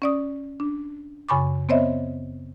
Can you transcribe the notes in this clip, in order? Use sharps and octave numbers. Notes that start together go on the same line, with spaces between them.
C#4 D5 D#6
D4
F#2 C#3 G#5 B5 C#6 D6
B3 C4 C5 C#5 D#5 E5